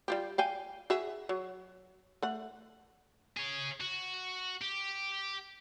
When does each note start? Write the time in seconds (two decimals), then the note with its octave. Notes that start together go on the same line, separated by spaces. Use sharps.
0.08 G3 F4 G4
0.38 F5 G5 G#5
0.90 F#4 G#4 E5
1.29 F#3
2.22 A3 F#5
3.37 G#4 C#5
3.80 F#4
4.61 G4